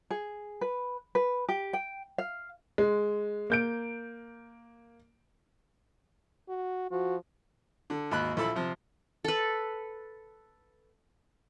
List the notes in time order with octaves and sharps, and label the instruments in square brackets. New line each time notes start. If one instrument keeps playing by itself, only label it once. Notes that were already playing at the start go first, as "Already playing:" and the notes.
[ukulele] G#4
B4
B4
G4
G5
F5
[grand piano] G#3
A#3 G6 D7
[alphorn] F#4
[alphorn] F3 [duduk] F#4
[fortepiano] D3
G#1 D#2 B5 F#6
A#1 E4 A4 E5 B5
C3 F3
[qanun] A4 B4